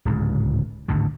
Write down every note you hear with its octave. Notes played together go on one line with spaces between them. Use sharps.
D1 C#2 G#2
G#1 D2 A2 D3